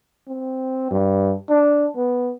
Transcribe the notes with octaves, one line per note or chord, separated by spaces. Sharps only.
C4
G2
D4
B3